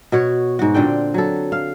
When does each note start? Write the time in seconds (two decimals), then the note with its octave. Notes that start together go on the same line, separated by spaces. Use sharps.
0.12 B2 F#4 C#5
0.59 G#2 F#4
0.74 A#2 D3 C4 G5
1.14 F#3 A4
1.52 F5